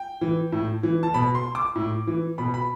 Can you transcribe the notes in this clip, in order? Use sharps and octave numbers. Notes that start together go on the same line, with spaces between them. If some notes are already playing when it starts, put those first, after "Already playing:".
Already playing: G5
E3
A2
E3
A5
B2 B5
C6
D6
A2
E3
B2 B5
B5